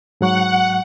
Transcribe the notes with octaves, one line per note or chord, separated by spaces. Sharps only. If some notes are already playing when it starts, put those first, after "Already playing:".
G#2 F#3 F#5 C#6